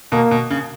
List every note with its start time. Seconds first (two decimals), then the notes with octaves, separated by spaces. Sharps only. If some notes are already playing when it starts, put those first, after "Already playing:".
0.12 B2 A#3
0.31 B2
0.50 C#3